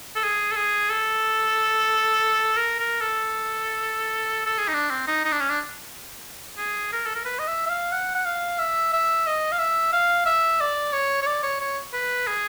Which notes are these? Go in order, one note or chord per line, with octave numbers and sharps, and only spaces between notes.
A4
G#4
A4
G#4
A4
A#4
A#4
A4
A4
G#4
D#4
D4
C4
D#4
D#4
D4
C#4
D4
G#4
A#4
A4
A#4
B4
D#5
E5
E5
F5
F#5
F#5
F5
E5
E5
D#5
F5
E5
F5
E5
D5
C#5
C#5
D5
C#5
C#5
B4
G#4